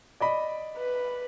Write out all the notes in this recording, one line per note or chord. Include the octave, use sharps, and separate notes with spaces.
D5 D#5 B5
B4